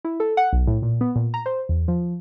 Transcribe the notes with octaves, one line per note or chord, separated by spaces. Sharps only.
E4
A4
F#5
B1
A2
A#2
B3
A#2
A#5
C5
E2
F3